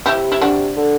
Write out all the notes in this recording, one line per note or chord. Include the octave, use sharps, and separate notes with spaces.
C3 E4 G4
E4
D4 F#4
D3